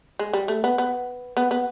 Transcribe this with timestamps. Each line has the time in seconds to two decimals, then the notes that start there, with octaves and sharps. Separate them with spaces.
0.19 G#3
0.33 G3
0.48 A3
0.64 B3
0.78 B3
1.37 B3
1.51 B3